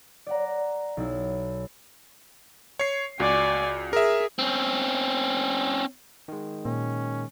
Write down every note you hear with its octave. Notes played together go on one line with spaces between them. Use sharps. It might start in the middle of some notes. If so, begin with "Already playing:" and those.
D5 F#5 A#5
B1 E4
C#5 C7
C#2 F#4 D5 G#5
G#4 A#4 E5
C4 C#4
D#3 G#3
A#2 C#4